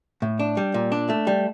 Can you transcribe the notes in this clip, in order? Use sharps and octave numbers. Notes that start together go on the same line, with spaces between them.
A2
D4
G3
A#2
D4
A3
G3